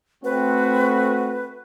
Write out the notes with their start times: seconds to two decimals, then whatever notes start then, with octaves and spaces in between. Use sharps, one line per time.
0.24 A3 C4 F#4 B4